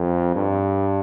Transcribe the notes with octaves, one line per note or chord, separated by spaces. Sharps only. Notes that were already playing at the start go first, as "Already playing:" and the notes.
Already playing: F2
G2